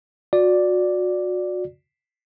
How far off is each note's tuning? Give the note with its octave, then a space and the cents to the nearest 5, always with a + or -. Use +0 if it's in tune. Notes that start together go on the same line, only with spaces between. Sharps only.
F#4 -30 D5 +0